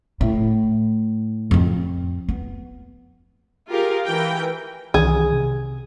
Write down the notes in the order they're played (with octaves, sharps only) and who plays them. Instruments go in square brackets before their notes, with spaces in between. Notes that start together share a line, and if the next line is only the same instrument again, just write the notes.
[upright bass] A2
F2 C4
B3
[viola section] F4 G4 G#4 A#4 F5
E3 A#4 G5
[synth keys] C2 D#3 E3 [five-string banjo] G#4
[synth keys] C3